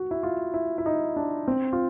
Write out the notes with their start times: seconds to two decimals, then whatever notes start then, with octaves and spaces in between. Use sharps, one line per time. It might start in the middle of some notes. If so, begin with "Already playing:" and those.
Already playing: F#4
0.11 E4
0.23 F4
0.54 E4
0.78 E4
0.86 D#4
1.16 D4
1.48 C4
1.73 F4